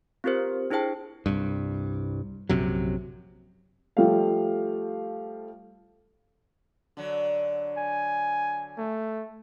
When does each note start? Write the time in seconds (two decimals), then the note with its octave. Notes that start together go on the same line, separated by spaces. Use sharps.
0.24 C4 F4 G4 A#4 C5
0.70 D4 E4 G#4 C5 G5 A5
1.26 C2 G2
2.49 A#1 F#2 C3 F#3
3.97 F3 G3 A3 F5
6.97 D3 F#3
7.77 G#5
8.78 A3